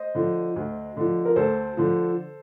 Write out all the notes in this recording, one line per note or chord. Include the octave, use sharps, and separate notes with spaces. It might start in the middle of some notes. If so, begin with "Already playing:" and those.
Already playing: C5 D#5
D3 F3
D2
D3 F3
A#4
D2 A4 C5
D3 F3